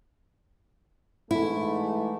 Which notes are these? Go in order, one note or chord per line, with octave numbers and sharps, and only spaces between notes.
G#2 E3 A3 E4